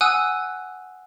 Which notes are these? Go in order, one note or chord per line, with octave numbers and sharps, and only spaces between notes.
F#5 G#5 D#6 E6 F#6 D#7